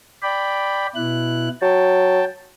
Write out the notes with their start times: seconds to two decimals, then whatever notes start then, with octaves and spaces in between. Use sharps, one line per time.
0.23 D5 G5 B5
0.95 B2 E4 F#6
1.62 F#3 G5 A5